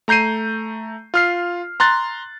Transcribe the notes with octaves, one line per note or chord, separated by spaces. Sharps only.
A3 A#5 G6 C7 D#7
F4 F6 C7
A#5 C6 F#6 A6